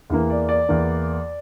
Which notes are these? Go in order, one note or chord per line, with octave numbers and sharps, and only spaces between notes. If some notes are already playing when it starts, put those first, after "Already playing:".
E2 E3 A#3
D5
D5
E2 E3 A#3